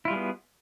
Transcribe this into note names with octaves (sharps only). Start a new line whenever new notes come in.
G3 B3 E4 F4 G#4